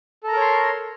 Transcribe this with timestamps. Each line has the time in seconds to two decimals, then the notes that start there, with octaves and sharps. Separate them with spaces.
0.24 A4
0.28 A#5
0.32 A#4
0.37 C#5
0.41 C6